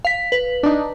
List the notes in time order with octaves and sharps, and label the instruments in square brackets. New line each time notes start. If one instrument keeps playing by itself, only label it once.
[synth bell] F5 B6
B4
[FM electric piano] D4 D#4